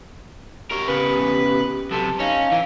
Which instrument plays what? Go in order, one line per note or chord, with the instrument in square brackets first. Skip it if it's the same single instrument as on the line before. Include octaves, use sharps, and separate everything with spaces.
[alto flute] G4 [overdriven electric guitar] A#4 C#5
[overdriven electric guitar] C#3 B3 [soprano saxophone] B4
[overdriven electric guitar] F#2 C3 [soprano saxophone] A4
[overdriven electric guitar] C#4 [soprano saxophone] D#4 [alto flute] F5
[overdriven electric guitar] E3